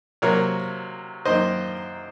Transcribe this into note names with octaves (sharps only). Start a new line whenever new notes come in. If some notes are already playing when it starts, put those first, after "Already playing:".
C3 F#3 A#3 A#4 C#5
F#2 D#3 A#3 C5 D#5